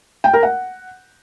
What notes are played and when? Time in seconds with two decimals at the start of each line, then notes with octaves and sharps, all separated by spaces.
0.24 G5
0.33 A#4
0.43 F#5